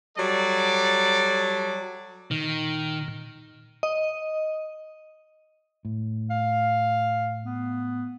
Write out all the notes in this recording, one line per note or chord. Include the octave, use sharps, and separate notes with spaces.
F#3 G3 A4 D5
A#2 D#3
D#5
A2
F5
B3